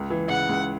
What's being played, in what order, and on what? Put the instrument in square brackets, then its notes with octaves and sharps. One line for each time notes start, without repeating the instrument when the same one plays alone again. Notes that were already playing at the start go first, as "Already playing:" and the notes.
Already playing: [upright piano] C#2
E3
[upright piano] C#3 [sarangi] F#5
[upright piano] C#2